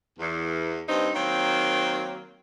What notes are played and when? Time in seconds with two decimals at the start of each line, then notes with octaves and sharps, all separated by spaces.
0.19 E2
0.88 G2 C4 D#4
1.15 D#3 F#3 A#3 C4